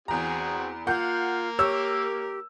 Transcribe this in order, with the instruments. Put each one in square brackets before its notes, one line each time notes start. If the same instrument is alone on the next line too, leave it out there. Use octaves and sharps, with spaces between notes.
[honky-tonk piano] E2 A#5 [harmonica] C4 F#4 G#4
[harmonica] A#3 A#4 [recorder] F4 [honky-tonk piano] F#5 [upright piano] G6
[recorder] G4 [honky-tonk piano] C#5 [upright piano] E6